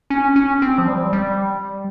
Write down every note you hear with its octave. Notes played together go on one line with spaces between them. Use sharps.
C#4
C#4
C4
F3
G3
G3